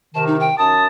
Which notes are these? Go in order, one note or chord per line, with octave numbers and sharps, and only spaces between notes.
C3 D#3 A5
D#4
G5
F#2 C#4 A5 D#6